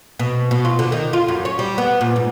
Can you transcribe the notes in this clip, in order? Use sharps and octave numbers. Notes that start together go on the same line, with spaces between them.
B2
B2
F4
D3
D#3
F4
F#2
C#5
G3
B3
A#2
G#2